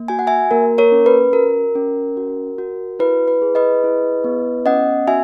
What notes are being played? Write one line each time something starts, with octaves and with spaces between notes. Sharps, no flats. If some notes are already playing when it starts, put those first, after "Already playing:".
Already playing: A#3
F#4 G#5
F#5
E5 G#5
A#3 A#4
A#4 C#5
C#4
B4
F#4 A#4
C#4
F#4
F#4
E4 B4
B4
G#4
B4 D#5
E4
B3
C#4 D#5 F#5
F#4 E5 G#5